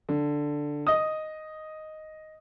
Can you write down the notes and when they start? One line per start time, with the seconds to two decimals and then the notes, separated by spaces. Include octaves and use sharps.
0.09 D3
0.87 D#5 D#6